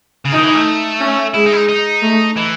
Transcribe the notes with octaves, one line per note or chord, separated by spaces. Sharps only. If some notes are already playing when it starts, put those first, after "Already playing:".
C#3
D#3 D#4
E3
A3
C#4
G#3 E4
D#4
E4
D#4
D#4
A3
E3